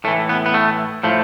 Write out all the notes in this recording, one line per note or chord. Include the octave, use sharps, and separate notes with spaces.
A2 E3 A3
B3
B3
A3
A2 F3 A3